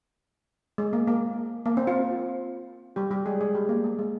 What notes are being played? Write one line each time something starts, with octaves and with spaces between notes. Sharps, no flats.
G#3
A#3
A#3
A#3
C4
F4
G3 G4
G3 G4
G#3 G#4
G#3 G#4
G3 G4
A#3
A#3
G#3